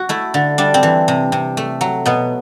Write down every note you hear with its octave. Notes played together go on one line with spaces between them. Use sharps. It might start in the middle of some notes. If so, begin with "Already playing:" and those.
Already playing: F#4
A3 E4
D3
G3 D4
C4
E3
C3
C3
A3
F#3
B2 B3